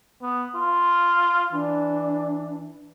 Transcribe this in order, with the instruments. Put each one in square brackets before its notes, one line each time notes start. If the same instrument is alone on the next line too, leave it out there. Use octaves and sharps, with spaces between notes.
[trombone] B3
F4
[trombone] E3 [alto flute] D4